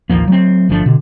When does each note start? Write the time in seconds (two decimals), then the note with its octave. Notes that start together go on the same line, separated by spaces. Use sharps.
0.10 A1 D#2 F3 A#3
0.28 F#3 A3 C4
0.69 G1 F3 A3 D4
0.86 B2 D3